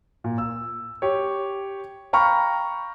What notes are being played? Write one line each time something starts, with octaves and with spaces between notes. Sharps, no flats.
A#2
E6
G4 C#5
F5 G5 A#5 B5 C#6 F6